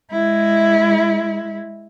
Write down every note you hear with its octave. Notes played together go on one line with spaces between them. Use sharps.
G#3 E4